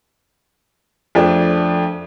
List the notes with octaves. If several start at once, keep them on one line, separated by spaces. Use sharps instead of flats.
F2 A3 D4